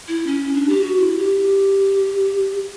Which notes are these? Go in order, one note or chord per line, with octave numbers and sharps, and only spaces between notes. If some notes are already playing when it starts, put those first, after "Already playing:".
E4
C#4
D4
G4
F#4
E4
G4